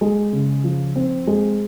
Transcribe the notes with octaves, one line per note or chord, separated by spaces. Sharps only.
G#3
C#3
F3
C4
G#3